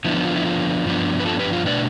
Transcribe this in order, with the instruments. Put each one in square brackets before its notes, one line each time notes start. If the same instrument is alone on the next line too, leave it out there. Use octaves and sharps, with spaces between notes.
[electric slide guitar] D3 F3 B3 D4 E4
F4
E4
F4
G2 F3 B3 D4
B4
F4 A4
G4 B4
F4
B2 A3 D4 B4 D5